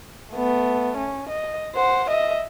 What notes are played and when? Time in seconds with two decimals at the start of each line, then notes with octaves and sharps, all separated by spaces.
0.32 A3 B3
0.97 C#4
1.29 D#5
1.75 C5 F#5
2.10 D#5 E5